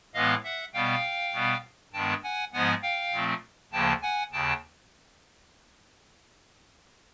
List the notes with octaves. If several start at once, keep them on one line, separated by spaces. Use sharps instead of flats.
A2 E3 G#3 B3 D#5 F5
E5 F#5
B2 G3 B3 F5 G5
B2 G3 B3
G2 D#3 G#3 B3 G5 A5
F#5 G#5
G#2 F3 G#3 B3 F#5 G#5
F5 G5
A#2 F3 A3 C4
D2 C#3 F3 A#3 G5 A5
F#5 G#5
D#2 C#3 G5 A5